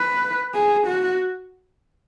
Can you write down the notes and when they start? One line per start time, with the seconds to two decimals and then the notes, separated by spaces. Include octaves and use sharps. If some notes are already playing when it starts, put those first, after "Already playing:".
Already playing: B4
0.54 G#4
0.87 F#4